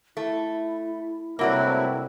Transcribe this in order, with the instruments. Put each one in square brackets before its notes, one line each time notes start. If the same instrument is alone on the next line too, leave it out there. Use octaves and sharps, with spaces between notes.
[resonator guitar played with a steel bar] A3 [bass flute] E4
[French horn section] G2 C3 [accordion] F#3 A3 E4 [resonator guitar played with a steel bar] A#3 F#4 D5